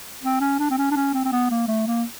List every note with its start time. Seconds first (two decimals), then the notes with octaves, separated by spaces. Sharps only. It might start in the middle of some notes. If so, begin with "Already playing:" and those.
0.24 C4
0.41 C#4
0.59 D4
0.71 C4
0.78 C#4
0.92 D4
0.96 C#4
1.14 C4
1.25 C4
1.32 B3
1.51 A#3
1.68 A3
1.87 A#3